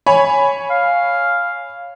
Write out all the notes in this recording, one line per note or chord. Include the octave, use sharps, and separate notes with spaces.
C#5 G#5 B5
F5